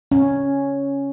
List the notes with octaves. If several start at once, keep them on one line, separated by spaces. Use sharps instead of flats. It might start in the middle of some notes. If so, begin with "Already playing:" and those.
C#4